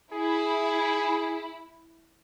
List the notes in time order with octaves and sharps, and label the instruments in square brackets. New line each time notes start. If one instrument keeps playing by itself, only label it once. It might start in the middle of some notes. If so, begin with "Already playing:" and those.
[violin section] E4 [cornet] G#4